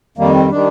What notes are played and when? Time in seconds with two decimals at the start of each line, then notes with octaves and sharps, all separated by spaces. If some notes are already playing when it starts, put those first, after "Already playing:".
0.18 F2 D#3 G3 A#3
0.35 C4
0.51 D#3 G3 D4